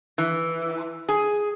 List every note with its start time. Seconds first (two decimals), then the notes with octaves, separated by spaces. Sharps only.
0.18 E3
1.09 G#4